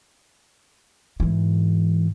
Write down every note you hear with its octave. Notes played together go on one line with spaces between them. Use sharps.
G#2 E3